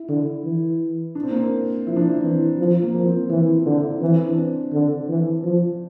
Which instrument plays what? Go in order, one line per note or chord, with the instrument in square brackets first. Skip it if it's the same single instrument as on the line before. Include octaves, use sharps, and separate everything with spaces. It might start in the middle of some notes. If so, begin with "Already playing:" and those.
Already playing: [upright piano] E4
[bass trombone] D3
E3
[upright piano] D4
C4
A#3
C4
[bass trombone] F3 [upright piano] E4
[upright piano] D4
E4
[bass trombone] E3 [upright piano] C4
[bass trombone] F3
[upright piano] A#3
[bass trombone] F3
[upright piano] C4
[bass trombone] E3 [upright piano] E4
[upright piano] F4
[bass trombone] D3
[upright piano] E4
[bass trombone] E3 [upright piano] C4
[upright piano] D4
C4
[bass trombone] D3
E3
F3